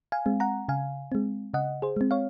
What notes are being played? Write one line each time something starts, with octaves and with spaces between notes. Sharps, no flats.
F5 G#5
G#3 C4
F#5 A#5
C#3 F5 G#5
G#3 C4
C#3 D#5 F#5
G#4 C5
G#3 C4
C#5 F5